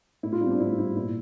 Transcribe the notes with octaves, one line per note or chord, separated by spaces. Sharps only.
A2 E4
F4
G3 E4
C4
D4
A2 E4
G3 E4
A#2 E4